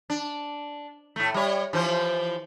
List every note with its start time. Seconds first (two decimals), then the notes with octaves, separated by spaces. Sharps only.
0.10 D4
1.16 A2 A3
1.34 G3 C#5
1.73 E3 F3 C5